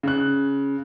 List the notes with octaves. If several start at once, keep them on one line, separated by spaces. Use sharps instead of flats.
C#3 F#6